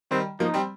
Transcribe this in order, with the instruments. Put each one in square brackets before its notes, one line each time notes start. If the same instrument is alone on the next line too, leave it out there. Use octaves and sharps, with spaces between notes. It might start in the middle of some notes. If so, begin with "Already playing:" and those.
[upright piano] D#3 G3 [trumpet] C4
[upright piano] F3 A#3 [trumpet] D#4
[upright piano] G3 C4